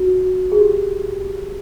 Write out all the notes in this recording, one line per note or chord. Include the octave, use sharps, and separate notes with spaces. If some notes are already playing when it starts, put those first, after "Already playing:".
Already playing: F#4
G#4
G4